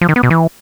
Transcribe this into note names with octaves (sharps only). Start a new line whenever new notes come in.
F3
D#3
B3
B2
E3